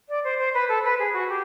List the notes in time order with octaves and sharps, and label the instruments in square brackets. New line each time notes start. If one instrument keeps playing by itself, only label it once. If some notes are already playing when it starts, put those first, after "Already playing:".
[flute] D5
C5
C5
B4
A4
B4
G#4
F#4
G4